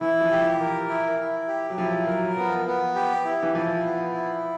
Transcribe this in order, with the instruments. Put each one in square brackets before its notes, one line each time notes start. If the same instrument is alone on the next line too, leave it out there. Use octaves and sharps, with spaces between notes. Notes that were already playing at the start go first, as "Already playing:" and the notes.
[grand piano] E3 [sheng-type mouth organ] E4
[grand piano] F3
[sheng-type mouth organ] G4
[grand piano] E3
[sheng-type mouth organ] A#4
E4
E4
G4
[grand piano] F#3
[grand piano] F3 [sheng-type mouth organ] E4
[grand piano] F#3 [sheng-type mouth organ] A#4
[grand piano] F3 [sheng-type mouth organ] B3
[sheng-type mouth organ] B3
G4
E4
[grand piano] E3
[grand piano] F3 [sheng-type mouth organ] E4
[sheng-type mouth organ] B3
E4